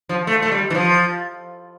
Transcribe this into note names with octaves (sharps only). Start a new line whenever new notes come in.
F3
A3
A3
G3
E3
F3